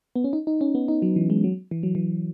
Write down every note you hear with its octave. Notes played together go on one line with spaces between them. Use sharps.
B3
C#4
D#4
D#4
C#4
B3
D#4
F#3
E3
G#3
F#3
E3
F#3
E3